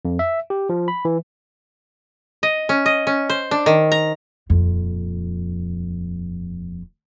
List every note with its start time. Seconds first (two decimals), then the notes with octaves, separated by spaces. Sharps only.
0.05 F2
0.19 E5
0.50 G4
0.69 F3
0.88 B5
1.05 E3
2.43 D#5
2.69 C#4
2.86 D#5
3.07 C#4
3.30 C5
3.51 D4
3.66 D#3
3.92 A#5
4.49 D#1 F2